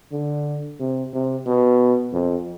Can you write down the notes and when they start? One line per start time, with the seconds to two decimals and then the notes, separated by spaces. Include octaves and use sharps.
0.12 D3
0.80 C3
1.13 C3
1.46 B2
2.13 F2